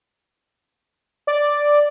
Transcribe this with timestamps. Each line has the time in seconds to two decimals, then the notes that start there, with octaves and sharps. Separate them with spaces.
1.27 D5